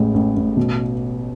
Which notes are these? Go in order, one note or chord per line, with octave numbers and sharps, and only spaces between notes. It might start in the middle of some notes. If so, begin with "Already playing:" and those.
Already playing: A1 A2 G#3
A1
A1
B2